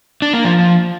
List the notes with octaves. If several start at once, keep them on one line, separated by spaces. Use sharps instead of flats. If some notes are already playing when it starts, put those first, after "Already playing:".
D4
A#3
F3